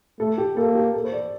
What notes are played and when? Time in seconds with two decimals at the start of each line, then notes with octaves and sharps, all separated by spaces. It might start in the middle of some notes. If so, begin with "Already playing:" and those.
0.20 A3 A4
0.38 G4
0.56 A#3 A4
0.75 G4
0.94 A4
1.04 C5
1.12 D5